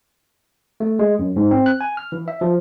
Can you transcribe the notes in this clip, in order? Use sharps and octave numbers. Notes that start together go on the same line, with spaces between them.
A3
G#3
F#2
G#2
C4
F#6
G#5
F6
E3
E5
F3